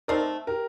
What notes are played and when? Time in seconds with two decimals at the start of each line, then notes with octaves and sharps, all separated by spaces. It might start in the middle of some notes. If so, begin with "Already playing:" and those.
0.08 A3 C4 D#4 A#4 D5
0.47 G4 A#4